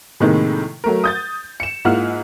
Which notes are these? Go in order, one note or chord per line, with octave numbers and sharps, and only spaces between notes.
A2 C3 D#3 G#3 A#3
F#3 A3 A#4
D#6 G6 A6
C#7 E7
G#2 A#3 E4 F4 F#5 F6